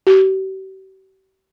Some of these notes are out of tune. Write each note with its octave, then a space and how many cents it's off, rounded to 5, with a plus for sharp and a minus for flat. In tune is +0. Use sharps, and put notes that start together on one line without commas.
G4 -45